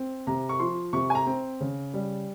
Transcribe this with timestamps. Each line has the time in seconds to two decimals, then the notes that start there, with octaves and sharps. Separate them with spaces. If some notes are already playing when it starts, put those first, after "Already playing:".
Already playing: C4
0.27 C3 A#5
0.49 C#6
0.59 F3 C6
0.93 C3 C#6
1.10 G#5
1.15 A#5
1.27 C4
1.61 C#3
1.94 G3